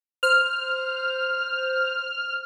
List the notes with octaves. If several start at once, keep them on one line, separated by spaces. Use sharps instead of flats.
C5 F6